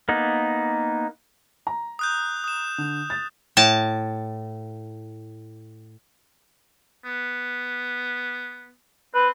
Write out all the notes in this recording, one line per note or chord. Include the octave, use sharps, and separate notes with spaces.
A#3 B3 D#4
A#5
D#6 F#6 G6
D#6 E7
D3
A6
A2 A5
B3
C4 B4